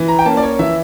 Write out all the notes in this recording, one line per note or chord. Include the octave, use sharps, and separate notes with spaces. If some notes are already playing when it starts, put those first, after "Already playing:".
Already playing: E3
A#5
G5
A#3 C#4 A5
D5
C#5
E3 E5